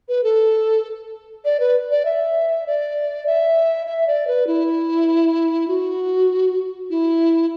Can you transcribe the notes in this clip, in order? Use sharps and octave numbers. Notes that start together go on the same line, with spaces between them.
B4
A4
D5
B4
D5
E5
D5
E5
E5
D5
B4
E4
F#4
E4